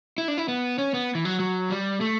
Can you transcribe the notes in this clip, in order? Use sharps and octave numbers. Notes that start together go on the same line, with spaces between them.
E4
D4
E4
B3
C#4
B3
E3
F#3
F#3
G3
A3